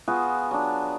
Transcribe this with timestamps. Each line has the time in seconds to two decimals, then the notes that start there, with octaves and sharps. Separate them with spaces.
0.08 B3 F4 F#4 G#4
0.51 F#3 D4